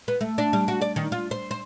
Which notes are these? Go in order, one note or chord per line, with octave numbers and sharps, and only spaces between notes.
B3
A3
D4
G3
F#4
D5
D#3
F4
C5
C5